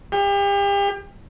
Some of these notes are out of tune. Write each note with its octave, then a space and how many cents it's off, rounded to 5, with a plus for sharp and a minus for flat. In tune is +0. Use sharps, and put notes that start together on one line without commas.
G4 +35